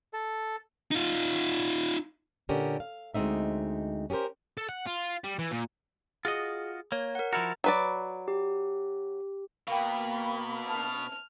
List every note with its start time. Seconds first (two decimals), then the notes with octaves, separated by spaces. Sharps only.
0.13 A4
0.91 D#4 F4
2.49 A#2 D3 C#4 G4 A#4
2.80 F5
3.14 D2 G#3 A#3 C4 D#4 E5
4.10 C#4 G4 G#4 A#4 C5
4.57 A4
4.69 F#5
4.87 F4
5.24 G3
5.39 E3
5.51 A#2
6.25 F4 F#4 G#4 D#5
6.92 A#3 C#5
7.15 A#4 F#5
7.33 F3 E4 F#4 A#5 F6 A6
7.64 F#3 B4 D5
8.28 G4
9.67 B2 A#3 F5 G5 B5
10.69 A5 F6